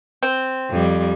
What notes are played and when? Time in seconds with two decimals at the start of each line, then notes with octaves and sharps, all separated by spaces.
0.23 C4
0.71 F2 G3